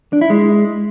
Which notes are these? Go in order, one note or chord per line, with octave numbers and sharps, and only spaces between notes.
D4
E4
G#3